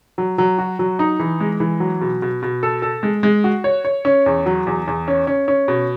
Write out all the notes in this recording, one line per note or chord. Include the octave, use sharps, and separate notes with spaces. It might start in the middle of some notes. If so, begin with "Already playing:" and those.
F#3
F#3
F#4
F#3
D#4
E3
G#3
E3
F#3
B2
B2
B2
A4
A4
G#3
G#3
F#4
C#5
C#5
C#4
E2
F#3
E2
E2
C#4
C#4
C#4
B2